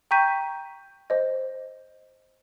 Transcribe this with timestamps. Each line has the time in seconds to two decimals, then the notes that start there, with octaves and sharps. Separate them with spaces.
0.11 G5 A#5 C#6 G6 B6 D#7
1.10 C5 D#5